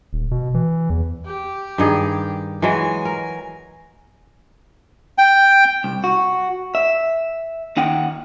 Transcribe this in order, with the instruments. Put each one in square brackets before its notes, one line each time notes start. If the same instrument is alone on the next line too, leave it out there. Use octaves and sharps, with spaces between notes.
[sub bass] D#1
B2
E3
E2
[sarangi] G4
[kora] G2 D#3 G#4
[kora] E3 F#3 G#3 [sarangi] G#5
[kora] A#4
[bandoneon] G5
[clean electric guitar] C2
F#4
E5
D#2 D#4 F#5 G5